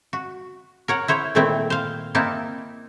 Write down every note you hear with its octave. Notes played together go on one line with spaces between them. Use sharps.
F#4
A#4 C#5 F#5
E4 C5 C#5
A#2 D#3 A3 C4 E4
C5 F5
A#3 C4 D#4 E4 A5